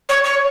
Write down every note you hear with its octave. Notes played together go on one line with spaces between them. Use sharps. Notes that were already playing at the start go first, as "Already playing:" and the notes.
C#5
C#5